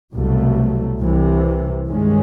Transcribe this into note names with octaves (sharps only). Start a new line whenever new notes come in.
C2 B2 F#3 A3
C2 C3 E3
G2 D#3 G#3 C#4